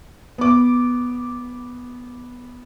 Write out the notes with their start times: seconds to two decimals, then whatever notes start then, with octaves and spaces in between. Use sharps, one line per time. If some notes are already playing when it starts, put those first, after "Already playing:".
0.38 B3 D6